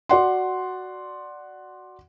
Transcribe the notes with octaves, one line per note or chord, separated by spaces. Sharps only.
F#4 D5 F#5 C6